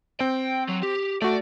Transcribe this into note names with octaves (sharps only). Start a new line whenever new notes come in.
C4 G5
F#3
G4
A3 F#4 D5